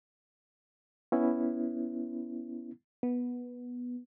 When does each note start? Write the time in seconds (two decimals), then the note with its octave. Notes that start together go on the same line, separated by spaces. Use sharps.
1.12 B3 C#4 E4
3.03 B3